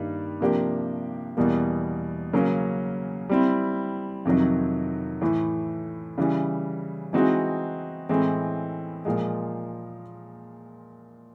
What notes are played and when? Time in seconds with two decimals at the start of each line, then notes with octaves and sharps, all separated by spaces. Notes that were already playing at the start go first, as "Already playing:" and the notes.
Already playing: G2 D#3 G3 A#3
0.40 C3 F3 A#3 D4 G4
1.37 E2 B2 G3 A#3
2.33 C#3 F#3 A#3 C#4
3.29 G3 C4 E4
4.25 F2 C3 D#3 F#3
5.21 A2 E3 A3
6.18 C#3 E3 G3
7.13 E3 G#3 C4 D#4 F#4
8.09 A2 E3 G#3 C4
9.05 A#2 F3 G#3